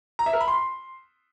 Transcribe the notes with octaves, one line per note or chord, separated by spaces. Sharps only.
A#5
E5
A#4
B5
C6